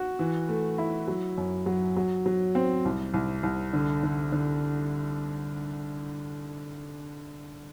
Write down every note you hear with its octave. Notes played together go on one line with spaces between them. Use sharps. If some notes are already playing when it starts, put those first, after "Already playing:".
Already playing: F#4
E3
A3
E4
F#3
F#2
F#3
F#3
F#3
C4
C2
C2
C2
D3
D3
D3